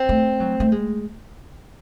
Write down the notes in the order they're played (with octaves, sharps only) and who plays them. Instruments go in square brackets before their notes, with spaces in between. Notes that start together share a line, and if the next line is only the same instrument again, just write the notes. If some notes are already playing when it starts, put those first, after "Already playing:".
Already playing: [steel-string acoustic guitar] C4
[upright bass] A3
F#3
A3
G#3